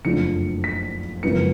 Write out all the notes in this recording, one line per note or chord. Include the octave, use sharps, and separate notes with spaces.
F#1 F2 F3 A3 D4 C#7
B6
G#1 F#2 C#3 F3 B3 C#7